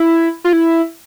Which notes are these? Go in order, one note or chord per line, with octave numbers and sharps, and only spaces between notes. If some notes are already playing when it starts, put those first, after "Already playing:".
Already playing: E4
F4
E4